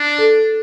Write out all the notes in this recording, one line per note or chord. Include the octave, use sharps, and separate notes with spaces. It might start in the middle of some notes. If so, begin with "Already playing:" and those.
Already playing: D4
A4